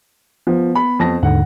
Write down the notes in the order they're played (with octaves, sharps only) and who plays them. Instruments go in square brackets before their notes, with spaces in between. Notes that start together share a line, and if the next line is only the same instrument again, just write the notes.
[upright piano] F3 [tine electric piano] B3
[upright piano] B5
F2 A5 A#6
[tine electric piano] D#2 G#2 D3 [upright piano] F#5